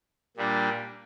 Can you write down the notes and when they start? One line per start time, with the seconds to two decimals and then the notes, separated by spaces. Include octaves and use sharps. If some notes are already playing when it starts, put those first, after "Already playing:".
0.37 A#2 G3 D4